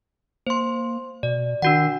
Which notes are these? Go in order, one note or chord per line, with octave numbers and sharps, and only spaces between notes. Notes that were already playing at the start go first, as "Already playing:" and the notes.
A#3 C5 C6
B2 D5
D#3 D4 F#4 F#5